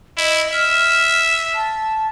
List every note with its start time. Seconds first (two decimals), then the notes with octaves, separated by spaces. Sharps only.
0.18 E4 D#5
0.53 E5 F6
1.55 A5